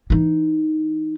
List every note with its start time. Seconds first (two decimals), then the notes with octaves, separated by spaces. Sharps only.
0.10 E3 D#4